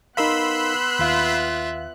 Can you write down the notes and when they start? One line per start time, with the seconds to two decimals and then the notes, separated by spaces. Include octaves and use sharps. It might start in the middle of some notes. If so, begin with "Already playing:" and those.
0.17 B3 D#4 A#4 F5 B5 C6 E6 F#6
0.99 D#2 F4 E5 F5